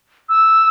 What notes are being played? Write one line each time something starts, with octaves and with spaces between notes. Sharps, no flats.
E6